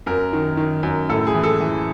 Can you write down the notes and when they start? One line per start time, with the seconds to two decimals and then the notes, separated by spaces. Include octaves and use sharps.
0.06 F#2 A#4
0.33 D#3
0.57 D#3
0.83 F#2
1.09 A2 A4
1.27 G#4
1.35 E3
1.43 A4
1.60 E3